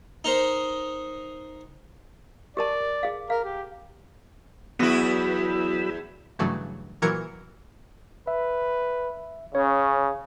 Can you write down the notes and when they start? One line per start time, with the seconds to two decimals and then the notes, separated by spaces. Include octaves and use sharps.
0.24 D#4 A#4 C5
2.57 G4 A#4 D5 A5
3.03 G#4 F5
3.30 A#4 F5
3.44 G4
4.79 E2 F#3 B3 E4 B5 D#6 E6 A#6
6.39 G2 C#3 E3 F#3 A3
7.02 A#2 E3 F#3 A#4 G#6 C#7
8.27 B4 E5
9.55 C#3 C#4 C#5